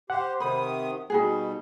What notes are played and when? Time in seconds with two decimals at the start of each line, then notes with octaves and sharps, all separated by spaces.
0.10 G4 C5 F#5
0.40 C3 D#3 C5 B5 D#6
1.10 B2 G3 D#4 F#4 G#4